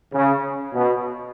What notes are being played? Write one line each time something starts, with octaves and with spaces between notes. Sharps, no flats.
C#3
B2